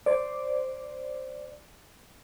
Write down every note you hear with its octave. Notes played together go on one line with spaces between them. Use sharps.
C5 D5